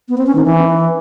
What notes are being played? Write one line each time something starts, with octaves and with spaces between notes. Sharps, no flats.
B3
C4
C#4
D#3
E3